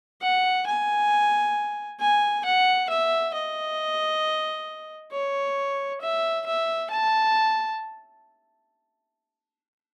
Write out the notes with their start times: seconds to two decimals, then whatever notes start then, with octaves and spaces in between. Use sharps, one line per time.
0.22 F#5
0.67 G#5
2.00 G#5
2.45 F#5
2.90 E5
3.34 D#5
5.12 C#5
6.01 E5
6.46 E5
6.90 A5